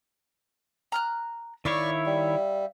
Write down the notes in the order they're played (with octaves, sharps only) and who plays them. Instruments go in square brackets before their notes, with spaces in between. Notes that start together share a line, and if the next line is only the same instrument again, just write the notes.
[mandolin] A#5 F6 F#6
[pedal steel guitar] D#3 E4 C#5 [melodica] D5 C#6 [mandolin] E5 F5
[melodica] G3